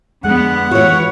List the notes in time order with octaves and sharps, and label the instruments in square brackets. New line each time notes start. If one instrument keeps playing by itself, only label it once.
[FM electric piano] F2 G#3 F#6 [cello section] D3 B3 [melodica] F#5
[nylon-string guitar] E3 F#4 [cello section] C#5